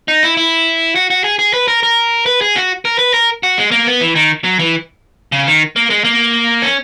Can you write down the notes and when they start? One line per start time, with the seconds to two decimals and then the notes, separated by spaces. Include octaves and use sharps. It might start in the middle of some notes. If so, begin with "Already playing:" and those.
0.08 D#4
0.23 E4
0.37 E4
0.95 F#4
1.10 F#4
1.24 G#4
1.39 G#4
1.54 B4
1.68 A#4
1.83 A#4
2.26 B4
2.41 G#4
2.56 F#4
2.85 A#4
2.99 B4
3.14 A#4
3.43 F#4
3.58 G#3
3.71 A#3
3.86 B3
4.01 E3
4.15 D#3
4.44 F#3
4.59 E3
5.32 C#3
5.47 D#3
5.76 A#3
5.90 G#3
6.04 A#3
6.62 C#4